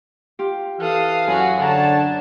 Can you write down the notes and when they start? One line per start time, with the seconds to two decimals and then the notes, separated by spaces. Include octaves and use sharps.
0.39 F4 G4
0.80 E3 A4 F5 D#6 F#6
1.27 F#2 F#4 G#4
1.60 D3 D4 C#5 F#5 A5 A#5